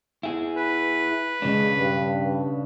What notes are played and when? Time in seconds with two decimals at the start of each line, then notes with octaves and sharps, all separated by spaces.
0.23 E4 G#4
0.57 B4
1.42 C#3 G#3 D4
1.76 G2